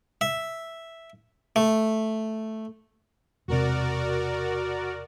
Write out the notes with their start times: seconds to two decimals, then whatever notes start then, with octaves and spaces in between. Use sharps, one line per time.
0.21 E5
1.56 A3
3.48 E1 C3 F#4 A#4 D5